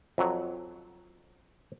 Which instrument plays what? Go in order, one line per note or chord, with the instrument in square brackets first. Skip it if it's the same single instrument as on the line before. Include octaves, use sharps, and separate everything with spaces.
[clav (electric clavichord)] F2 F#3